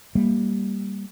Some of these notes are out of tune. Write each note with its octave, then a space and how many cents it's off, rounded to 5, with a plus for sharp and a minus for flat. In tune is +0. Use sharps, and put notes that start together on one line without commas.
G3 +10 A#3 +0